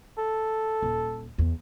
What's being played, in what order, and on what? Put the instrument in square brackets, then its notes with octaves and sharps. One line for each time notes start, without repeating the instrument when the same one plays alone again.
[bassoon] A4
[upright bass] D#1
E2